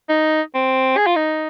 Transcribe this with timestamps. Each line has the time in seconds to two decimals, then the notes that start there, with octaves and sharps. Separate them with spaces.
0.09 D#4
0.55 C4
0.97 G#4
1.07 F4
1.16 D#4